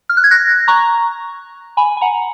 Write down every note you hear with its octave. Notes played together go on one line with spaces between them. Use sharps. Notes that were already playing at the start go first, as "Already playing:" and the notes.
F6
F#6
G#6
F#6 A#6
A#5 C#6
G#5 B5
G#5
F#5 A#5